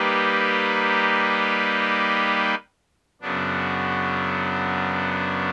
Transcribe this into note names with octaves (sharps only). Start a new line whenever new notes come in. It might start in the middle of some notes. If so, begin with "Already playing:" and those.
Already playing: G3 A#3 D#4 G4 B4
F#2 C#3 F#3 B3 D4